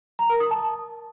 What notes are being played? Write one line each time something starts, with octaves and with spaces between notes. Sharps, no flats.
A#5
A#4
D#6
A5